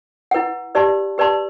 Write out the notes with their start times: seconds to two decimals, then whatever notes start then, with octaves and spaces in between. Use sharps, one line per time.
0.31 E4 B4 F#5
0.75 G4 B4 D5 A5 C6
1.18 G4 B4 D5 A5 C6